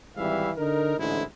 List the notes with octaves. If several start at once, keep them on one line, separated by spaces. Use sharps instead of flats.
G#1 E3 G3 E5 F5
D3 D#4 A#4
A1 G#2 D3 G#3 E4